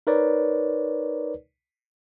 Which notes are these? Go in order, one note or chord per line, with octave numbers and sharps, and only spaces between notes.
D#4 A#4 B4 C#5 D5